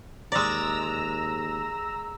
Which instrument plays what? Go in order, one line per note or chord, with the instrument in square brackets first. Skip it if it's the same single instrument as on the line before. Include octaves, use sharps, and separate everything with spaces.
[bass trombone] D#2 [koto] G#3 D5 [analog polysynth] A#5 E6